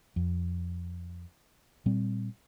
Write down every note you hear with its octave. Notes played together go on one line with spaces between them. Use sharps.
F2
A#2 G3 C4